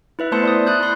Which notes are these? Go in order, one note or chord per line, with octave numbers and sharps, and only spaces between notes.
E4 B4 E5
A3 B3 C5 A5 C6 C#7
D5 C6 D#6
E4 D#6 F#6 G6
B5 C6 F#6